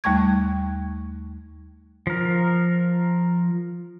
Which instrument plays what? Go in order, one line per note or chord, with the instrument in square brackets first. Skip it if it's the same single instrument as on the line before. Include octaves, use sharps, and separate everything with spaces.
[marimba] D#2 G3 A3 C#6 G#6
[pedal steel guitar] F3 A#4